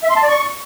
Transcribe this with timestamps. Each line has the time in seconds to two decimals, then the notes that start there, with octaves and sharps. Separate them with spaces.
0.03 E5
0.10 C6
0.16 A5
0.22 D5
0.29 C#6